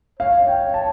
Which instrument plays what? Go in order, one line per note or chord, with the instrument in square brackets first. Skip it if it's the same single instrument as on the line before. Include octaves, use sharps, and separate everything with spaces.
[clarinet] C#5 [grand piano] F5
[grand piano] G5
A5